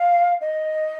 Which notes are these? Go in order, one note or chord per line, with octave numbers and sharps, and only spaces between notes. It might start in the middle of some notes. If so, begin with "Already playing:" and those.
Already playing: F5
D#5